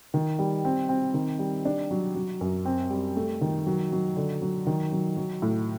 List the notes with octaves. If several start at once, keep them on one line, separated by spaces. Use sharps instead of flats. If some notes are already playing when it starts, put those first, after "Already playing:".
D#3
G3
C4
C4
D#3
G3
D4
F#3
F#3
F#2
C4
G3
A3
D#3
F#3
F#3
D3
F#3
D#3
F#3
F#3
A2